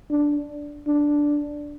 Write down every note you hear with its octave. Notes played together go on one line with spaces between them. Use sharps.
D4
D4